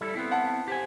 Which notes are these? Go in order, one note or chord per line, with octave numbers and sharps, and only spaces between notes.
G3 E4 A4
B3 C4 E4
F#5 A5
G4 C5 G#5